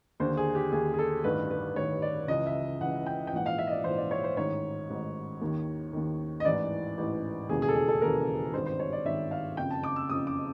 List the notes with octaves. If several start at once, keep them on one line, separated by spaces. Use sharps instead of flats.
D#2 D3 C5
G#4
G4
D#2 D3 G#4
G#4
A4
A1 G2 D#3 B4
B4
A1 G2 D#3 C#5
D5
C#2 C#3 E3 D#5
E5
C#2 C#3 E3 F#5
G5
G5
A#1 G#2 E3 F#5
F5
E5
D#5
D5
A#1 G#2 E3 C5
D5
C#5
C5
A1 G#2 D#3 C#5
A1 G#2 D#3
D#2 D#3
D#2 D#3
D#5
A1 G#2 E3 D5
A1 G#2 E3
E1 D#2 C#3 E3 G#4
G#4
A4
G#4
A4
E1 D#2 C#3 E3 A#4
G#1 G2 D#3 C5
C5
C#5
D5
G#1 G2 D#3 E5
F5
F#1 F2 C#3 G5
A5
D6
E6
F#1 F2 C#3 D#6
D6